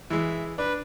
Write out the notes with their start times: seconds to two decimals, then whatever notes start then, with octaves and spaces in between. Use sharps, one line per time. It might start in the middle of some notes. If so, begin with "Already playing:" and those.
0.10 E3 G#3 E5
0.58 D4 B4